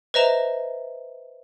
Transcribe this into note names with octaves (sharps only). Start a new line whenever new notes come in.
B4 C5 D#5 E5 A#5 E7